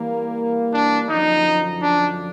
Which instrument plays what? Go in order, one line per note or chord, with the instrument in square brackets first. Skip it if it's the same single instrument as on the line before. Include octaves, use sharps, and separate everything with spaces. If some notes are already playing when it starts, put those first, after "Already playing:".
Already playing: [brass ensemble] E3 G3 A#3
[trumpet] D4
[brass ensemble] F#2 D3 F3 [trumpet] D#4
[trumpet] D4